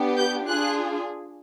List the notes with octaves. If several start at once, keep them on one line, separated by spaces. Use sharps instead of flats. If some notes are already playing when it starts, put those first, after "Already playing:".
Already playing: B3 D4 G4
G6
D4 F4 G#4 F#6